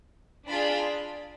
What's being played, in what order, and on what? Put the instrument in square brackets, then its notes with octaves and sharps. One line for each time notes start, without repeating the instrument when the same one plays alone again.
[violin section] D4 F4 G#4 B5